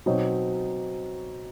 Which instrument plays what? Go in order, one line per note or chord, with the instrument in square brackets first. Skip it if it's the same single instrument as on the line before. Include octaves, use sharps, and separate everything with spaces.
[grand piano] B2 F#3 C4 D#4 F#4